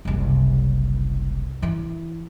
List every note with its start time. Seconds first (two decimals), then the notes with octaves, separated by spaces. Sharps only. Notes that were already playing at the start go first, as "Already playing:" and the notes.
0.05 F#1 C2
1.62 E3 E4